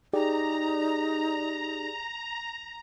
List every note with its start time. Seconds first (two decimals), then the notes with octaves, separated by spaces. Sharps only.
0.13 D#4 G4 G#4 D5 A#5